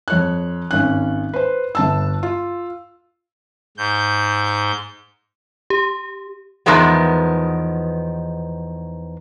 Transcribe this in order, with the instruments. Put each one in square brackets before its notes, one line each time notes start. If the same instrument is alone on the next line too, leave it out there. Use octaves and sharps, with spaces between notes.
[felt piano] F2 C#5 F#6
G#1 C#4 F#6
B4 C5
G1 A5 E6
F4
[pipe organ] G#2 G6
[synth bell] G4
[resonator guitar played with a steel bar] E2 D#3 F3 G#3 B3